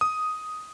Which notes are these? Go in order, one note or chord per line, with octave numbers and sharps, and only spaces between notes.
D#6